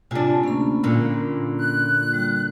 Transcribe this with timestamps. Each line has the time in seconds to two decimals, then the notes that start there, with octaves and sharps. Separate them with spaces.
0.11 C3 D4 F4 G#5
0.43 D2 A#3 C#4 B5
0.83 A#2 D3
1.58 F#6
2.13 G3